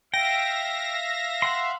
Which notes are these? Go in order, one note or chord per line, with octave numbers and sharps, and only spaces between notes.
E5 F5 G5 A#6
F#5 C6